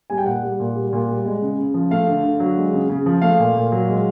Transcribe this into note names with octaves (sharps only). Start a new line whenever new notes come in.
G3 G#5
G5
A#2 F#5
G3
A#2
G3
A#2
G3
G#3
C#3
C#3
F3
A3 F5
D3
D3
F#3
G#3
C#3
C#3
F3
A3 F5
A#2
A#2
F#3
G#3